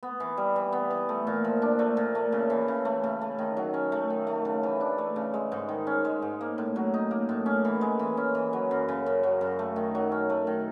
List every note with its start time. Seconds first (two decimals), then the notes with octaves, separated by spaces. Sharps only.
0.03 B3
0.20 E3
0.37 G3
0.56 E3
0.72 B3
0.90 E3
1.09 A3
1.27 A#2
1.45 F3
1.62 D4
1.79 A3
1.97 A#2
2.15 A3
2.32 C#3
2.50 E3
2.68 C#3
2.85 A3
3.04 C#3
3.21 A3
3.38 D#3
3.57 F#3
3.74 C#4
3.92 A3
4.10 D#3
4.27 A3
4.45 C#3
4.63 E3
4.81 D4
4.98 A3
5.16 C#3
5.34 G#3
5.52 G#2
5.69 D#3
5.87 C#4
6.05 G#3
6.22 G#2
6.41 A#3
6.58 A2
6.76 F#3
6.94 D#4
7.11 A#3
7.29 A2
7.46 C#4
7.65 E3
7.81 G#3
7.99 E3
8.17 C#4
8.35 E3
8.53 F#3
8.71 F#2
8.89 C#3
9.06 F#2
9.23 F#3
9.41 F#2
9.59 A3
9.76 D#3
9.95 F#3
10.12 C#4
10.30 A3
10.47 D#3